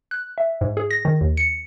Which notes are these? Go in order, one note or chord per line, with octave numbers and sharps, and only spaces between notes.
F#6
E5
G#2
G#4
A#6
D#3
D#2
C#7